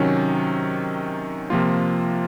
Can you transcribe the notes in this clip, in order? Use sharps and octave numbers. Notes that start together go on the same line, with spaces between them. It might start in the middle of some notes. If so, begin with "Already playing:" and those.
Already playing: C3 D#3 F#3 C#4
C3 F3 A#3 F4